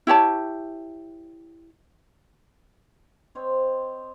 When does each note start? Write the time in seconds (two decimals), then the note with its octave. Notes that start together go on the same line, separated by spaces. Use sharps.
0.07 E4 G4 C#5 A5
3.35 C4 C5 C#5 D#5